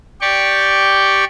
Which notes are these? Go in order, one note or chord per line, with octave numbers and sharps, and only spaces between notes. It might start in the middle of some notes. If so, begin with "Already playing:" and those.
G4 D5 G5 C#6